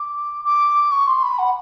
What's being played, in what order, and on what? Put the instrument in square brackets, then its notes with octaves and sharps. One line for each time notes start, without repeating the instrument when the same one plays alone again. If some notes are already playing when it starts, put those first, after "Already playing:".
Already playing: [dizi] D6
D6
C#6
C6
B5
F#5